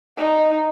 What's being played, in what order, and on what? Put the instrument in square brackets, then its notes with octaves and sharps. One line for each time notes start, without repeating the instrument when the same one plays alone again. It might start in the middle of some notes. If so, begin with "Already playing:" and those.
[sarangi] D#4